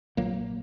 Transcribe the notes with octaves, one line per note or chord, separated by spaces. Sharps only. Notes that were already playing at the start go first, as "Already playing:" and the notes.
A#1 A#2 F#3 A#3